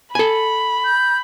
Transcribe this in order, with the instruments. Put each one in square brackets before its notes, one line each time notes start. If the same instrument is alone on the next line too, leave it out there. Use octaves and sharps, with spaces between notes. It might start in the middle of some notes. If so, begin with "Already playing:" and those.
[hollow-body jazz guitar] A4 G#5 [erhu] B5
[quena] G6